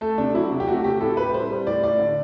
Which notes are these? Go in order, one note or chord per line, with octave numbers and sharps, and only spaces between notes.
A3 A4
C3 D4
F#3 E4
C3
G4
A3 F#4
C3 G4
A2 A4
A2 B4
G3 C5
G3
A2 D5
A2 D5
D3